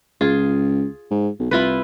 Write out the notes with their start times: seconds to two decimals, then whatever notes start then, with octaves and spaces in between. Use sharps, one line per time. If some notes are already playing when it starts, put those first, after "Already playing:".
0.21 C#2 F4 G#4
1.11 G#2
1.39 B1
1.51 C2 E4 F4 B4